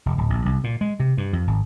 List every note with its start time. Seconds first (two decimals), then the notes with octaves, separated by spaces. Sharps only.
0.06 F1
0.18 D1
0.30 A#1
0.46 C2
0.64 A#2
0.81 G#3
1.00 C3
1.18 G2
1.33 F2
1.47 G#1